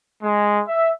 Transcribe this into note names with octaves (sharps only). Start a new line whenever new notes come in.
G#3
E5